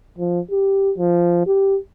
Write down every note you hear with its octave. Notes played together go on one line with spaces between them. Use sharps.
F3
G4
F3
G4